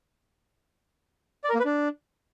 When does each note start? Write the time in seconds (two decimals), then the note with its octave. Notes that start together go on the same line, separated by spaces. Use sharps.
1.44 D5
1.49 A#4
1.54 A#3
1.60 B4
1.65 D4